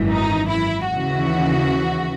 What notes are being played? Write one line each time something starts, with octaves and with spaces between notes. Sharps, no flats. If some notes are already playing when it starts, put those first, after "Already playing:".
Already playing: G#1 F#2 E3
D#4
E4
D#2 C#3 E3 F#4